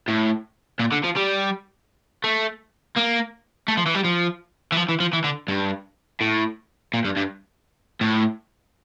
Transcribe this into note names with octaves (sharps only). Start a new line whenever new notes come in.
A2
A#2
D3
F3
G3
A3
A#3
A3
F3
E3
G3
F3
E3
F3
E3
F3
E3
D3
G2
A2
A#2
G2
G2
A2